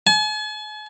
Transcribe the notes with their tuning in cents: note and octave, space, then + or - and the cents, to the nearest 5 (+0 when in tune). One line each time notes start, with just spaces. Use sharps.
G#5 +45